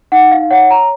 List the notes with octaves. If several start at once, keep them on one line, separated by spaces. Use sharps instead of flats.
D#4 F#5
F5
C#5 F#5
A#5